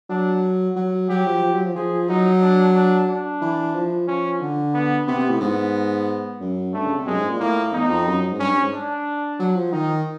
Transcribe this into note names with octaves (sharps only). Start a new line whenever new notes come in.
F#3 D4
F#3
F#3 G4
F3
F3
F#3
F3
F3 G#4
F#3 D#4
D4
D4
D4
E3
F3
F3 C#4
D3
B3
C3 B3
C3
A2
G#2 B3
F#2
G2 A3
C#3
C3
F#2 G#3
G#2
A#2
A2 A#3
E2 D#4
F2
F#2
G#2
G2 C#4
G#2
D4
F#3
F3
D#3 D#4